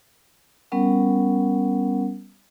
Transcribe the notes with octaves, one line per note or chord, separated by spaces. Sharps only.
G3 B3 C#4 A#4 F#5